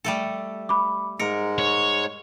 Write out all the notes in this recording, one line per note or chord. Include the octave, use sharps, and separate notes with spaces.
G3 A3 A4
B5 D6
G#2 G#3 A#4 C#7
C#5